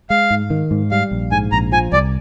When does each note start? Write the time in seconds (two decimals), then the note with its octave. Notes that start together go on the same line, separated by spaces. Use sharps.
0.10 G#3 F5
0.31 G#2
0.50 D#3
0.71 G#2
0.91 G3 F5
1.11 A#1
1.32 G#2 G#5
1.52 A#1 A#5
1.72 F3 G#5
1.92 C2 D5